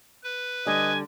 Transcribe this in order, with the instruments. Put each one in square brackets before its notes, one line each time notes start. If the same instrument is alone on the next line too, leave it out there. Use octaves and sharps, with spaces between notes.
[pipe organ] B4
[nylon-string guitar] D3 G3 [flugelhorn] D#5 [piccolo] G#5